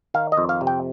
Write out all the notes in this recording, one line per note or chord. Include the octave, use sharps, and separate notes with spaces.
D#3 F5
D#5
F2
F5
C3
G5